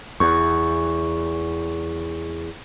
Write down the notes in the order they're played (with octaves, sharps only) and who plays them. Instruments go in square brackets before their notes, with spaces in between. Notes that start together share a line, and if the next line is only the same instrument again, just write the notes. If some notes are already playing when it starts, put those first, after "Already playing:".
[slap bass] E2 [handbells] C#6